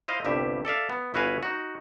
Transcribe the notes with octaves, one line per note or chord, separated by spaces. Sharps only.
E4 C5 D#5 F5
G1 C2 G2 G4 E5
A4 D5 E5 F5
B3
G1 E4 F#4 B4 F5 G#5
D#4 F#4